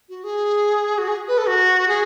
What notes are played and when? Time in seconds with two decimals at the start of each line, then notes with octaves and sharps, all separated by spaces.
0.09 F#4
0.24 G#4
0.98 F#4
1.08 G#4
1.28 B4
1.38 A4
1.48 F#4
1.88 G#4